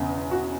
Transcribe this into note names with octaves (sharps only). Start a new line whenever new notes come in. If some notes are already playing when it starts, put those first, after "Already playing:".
Already playing: E1 E2 C#3
F#4